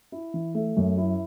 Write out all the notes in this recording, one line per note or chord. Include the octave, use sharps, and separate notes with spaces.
E4
E3
A3
F#2
E4